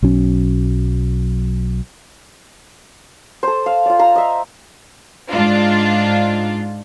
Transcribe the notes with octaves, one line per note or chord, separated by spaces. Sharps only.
B1 F#3 C#4
A4 C5
F5
F4 D5
F5 A#5 E6
D#5 E5
G#2 D4 F4